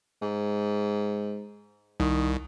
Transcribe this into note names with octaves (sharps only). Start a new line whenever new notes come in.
G#2
C2 D#3